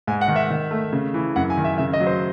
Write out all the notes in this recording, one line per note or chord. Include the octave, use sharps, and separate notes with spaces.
G#2 G#5
F#5
D#3
E5
D#3
A3
C#3
E3
F#2 F#5
G#5
D#3
E5
C#3 E5
D#5
F#3
C5